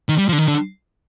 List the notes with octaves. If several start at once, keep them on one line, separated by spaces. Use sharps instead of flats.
D#3
G3
F3
D3
D#3
D3